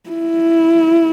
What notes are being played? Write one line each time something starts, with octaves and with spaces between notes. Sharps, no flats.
E4